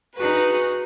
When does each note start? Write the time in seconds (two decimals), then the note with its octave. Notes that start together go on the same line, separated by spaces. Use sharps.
0.15 D#4 F#4 G#4 B4